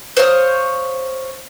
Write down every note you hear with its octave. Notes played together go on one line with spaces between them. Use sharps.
C5 C#5 F5 D#6